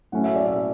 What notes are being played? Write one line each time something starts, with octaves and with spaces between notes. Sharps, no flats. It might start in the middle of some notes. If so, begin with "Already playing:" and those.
A2 F#3 A3 C#4 E4 F#5
E5
D5
E5